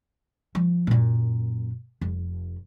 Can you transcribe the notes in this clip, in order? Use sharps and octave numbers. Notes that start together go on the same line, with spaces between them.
F3
F#2 A#2
F1